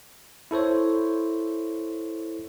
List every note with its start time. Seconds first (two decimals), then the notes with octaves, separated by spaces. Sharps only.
0.51 E4 A4 C5 C#5